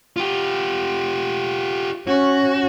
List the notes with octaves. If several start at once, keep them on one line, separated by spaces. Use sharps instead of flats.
F4 G4
C#4 F#4